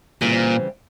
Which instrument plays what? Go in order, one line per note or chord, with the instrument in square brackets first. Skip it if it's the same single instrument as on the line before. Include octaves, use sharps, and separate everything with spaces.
[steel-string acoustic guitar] F2 C#3 E3 G3 C4 [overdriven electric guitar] A#2